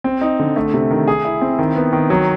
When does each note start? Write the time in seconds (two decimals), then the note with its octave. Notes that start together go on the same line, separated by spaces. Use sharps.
0.04 C4
0.21 D#4
0.39 D3
0.56 A3
0.74 C3
0.90 D#3
1.08 G#4
1.25 E4
1.41 C4
1.59 D#3
1.76 B3
1.93 D#3
2.10 F#3